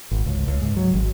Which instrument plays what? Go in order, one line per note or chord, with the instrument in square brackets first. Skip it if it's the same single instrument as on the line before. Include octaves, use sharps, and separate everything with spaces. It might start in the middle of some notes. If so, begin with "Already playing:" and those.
[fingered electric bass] G#1
C#2
C#2
G#2
F#3
G#1